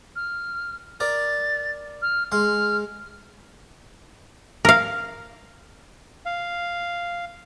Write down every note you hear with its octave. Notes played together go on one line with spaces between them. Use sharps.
F6
A#4 D5 A6
F6
G#3 C6 F6
A#4 F5
F5